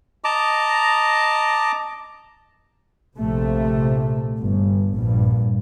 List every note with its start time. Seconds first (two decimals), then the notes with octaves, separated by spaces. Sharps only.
0.24 D#5 A5 A#5 D6
3.18 A#1 C3 A3
4.37 G1
4.94 A#1 G2